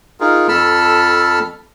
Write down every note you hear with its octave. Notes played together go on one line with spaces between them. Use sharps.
D#4 F4 G#4 A#4
F2 A4 A5 B5 E6 F6